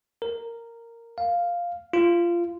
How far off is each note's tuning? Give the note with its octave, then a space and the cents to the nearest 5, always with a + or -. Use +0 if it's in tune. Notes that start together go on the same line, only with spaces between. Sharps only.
A#4 -10
F5 +0
F4 -20